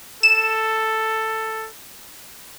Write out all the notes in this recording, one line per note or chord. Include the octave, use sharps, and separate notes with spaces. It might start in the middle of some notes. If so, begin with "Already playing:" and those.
A4 E7